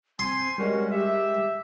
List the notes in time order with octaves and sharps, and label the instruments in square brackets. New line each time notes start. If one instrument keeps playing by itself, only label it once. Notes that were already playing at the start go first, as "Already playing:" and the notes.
[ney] C4 [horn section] C5 G#5 [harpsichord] C6
[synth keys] G3 G#3 [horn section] C#4 F#4 [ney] A#4
[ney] G4 [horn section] E5